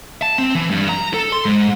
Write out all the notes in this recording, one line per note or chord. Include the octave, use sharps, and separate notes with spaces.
A5
C4
E3
G2
A#5
A4
C6
G#2